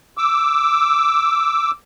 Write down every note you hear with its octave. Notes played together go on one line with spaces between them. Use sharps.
D6 E6